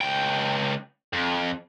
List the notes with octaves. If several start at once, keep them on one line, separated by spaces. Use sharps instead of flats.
C#2 G5
F2